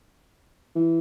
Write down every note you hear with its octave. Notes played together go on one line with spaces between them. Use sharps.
E3